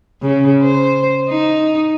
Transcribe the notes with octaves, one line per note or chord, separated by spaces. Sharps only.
C#3
C5
D#4